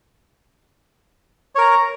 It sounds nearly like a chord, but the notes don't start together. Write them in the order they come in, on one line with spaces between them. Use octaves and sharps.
C#5 A#4 A#5